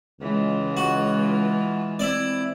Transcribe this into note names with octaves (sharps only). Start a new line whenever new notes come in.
C#2 E3 G#3 F4
F#4
C4 E4 D5